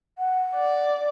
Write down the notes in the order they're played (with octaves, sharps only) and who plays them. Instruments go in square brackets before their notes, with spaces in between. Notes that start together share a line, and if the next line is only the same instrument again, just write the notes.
[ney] F#5
[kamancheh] D5